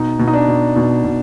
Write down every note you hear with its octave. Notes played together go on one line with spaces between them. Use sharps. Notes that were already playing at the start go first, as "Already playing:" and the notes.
Already playing: B2 D#4
B2
D#4
D4
B2
B2 D#4
B2